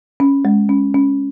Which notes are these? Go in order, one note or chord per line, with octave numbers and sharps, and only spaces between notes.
C#4
G#3
C#4
C#4